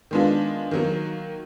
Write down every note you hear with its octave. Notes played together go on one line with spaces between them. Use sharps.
D#3 G#3 B3 D4 F4
D#3 F#3 A#3